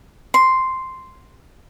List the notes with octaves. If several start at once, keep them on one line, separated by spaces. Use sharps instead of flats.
C6